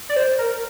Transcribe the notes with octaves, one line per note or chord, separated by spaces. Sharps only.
D5
C5
A#4